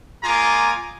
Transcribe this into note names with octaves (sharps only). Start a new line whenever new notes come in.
G#3 A#3 F4 G#5 A#5 D6